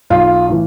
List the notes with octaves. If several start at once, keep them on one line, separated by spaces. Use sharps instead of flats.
B1 F4
A2 E3